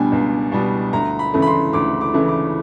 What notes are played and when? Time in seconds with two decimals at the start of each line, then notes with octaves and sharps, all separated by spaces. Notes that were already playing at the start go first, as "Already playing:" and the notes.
Already playing: C#2 B2 G3 B3 D4 G5 G#5
0.12 C#2
0.52 B2 G3 B3 D4
0.93 D2 A#5
1.19 B5
1.34 C#3 E3 A3
1.42 B5
1.47 C6
1.73 D2 D6
2.01 D6
2.14 C#3 E3 A3
2.28 D6